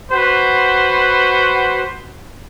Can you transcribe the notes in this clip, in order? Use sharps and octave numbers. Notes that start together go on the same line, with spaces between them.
F#4 B4 C5 F#5